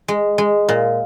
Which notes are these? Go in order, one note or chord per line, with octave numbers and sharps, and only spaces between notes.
G#3
G#3
A#2